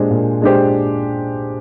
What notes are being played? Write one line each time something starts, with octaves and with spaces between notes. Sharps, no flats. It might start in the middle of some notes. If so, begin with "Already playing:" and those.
Already playing: A#2 G#3 D4 G4 C5
A#2
G#3 D4 G4 C5